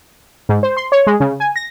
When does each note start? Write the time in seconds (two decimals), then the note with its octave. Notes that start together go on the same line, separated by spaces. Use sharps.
0.49 G#2
0.63 C5
0.77 C6
0.92 C#5
1.07 G#3
1.20 C#3
1.40 G#5
1.56 A#6